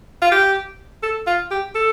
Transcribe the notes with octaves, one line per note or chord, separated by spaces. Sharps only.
F4
G4
A4
F4
G4
A4